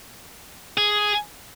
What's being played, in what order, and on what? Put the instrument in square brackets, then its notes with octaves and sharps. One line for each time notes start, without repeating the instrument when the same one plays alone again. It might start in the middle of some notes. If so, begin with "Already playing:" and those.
[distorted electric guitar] G#4